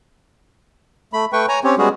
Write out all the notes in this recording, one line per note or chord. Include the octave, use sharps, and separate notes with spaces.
A3 B5
A3 B4 G5 C#6
C#5 G#5 A#5
C4 C#4 G4 C#5
G3 G#3 B3 C#4 F#4 G#4